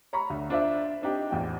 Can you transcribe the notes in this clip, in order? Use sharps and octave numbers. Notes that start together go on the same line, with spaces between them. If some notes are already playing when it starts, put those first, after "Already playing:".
C#5 A#5 B5 C#6
D2
D4 F4 C5 D5 E5
C4 D4 D#4 G4
A1 E2 F4 G5